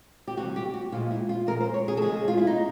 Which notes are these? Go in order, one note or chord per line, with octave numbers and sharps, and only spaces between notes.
G4
C3 E3 G3 F#4
G4
F#4
A#2 F3 G#3 F4
E4
F4
A#2 F3 G#3 A#4
C5
C#5
G#4
A4
C#3 F3 G#3 G#4
F4
E4
D#4